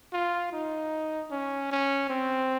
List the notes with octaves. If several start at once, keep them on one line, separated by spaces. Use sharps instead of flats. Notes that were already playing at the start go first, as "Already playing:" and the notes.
F4
D#4
C#4
C#4
C4